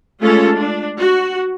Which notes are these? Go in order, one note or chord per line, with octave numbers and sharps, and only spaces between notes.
G#3 A3 C#4 F4 A4
D4
F#4